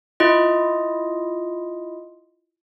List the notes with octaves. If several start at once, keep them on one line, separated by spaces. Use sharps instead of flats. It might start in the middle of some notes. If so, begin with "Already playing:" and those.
E4 F4 D#5